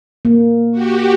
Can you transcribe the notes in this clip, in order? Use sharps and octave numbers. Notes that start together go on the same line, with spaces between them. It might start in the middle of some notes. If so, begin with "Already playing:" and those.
A#3
F#4 G4